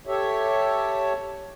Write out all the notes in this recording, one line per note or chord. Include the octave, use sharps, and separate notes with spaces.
G4 A4 C#5 E5